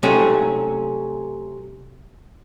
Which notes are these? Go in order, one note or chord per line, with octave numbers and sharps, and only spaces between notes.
C3 F#3 A3 C#4